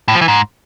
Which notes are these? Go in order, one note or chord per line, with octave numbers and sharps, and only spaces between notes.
A2
F3
E3
G#2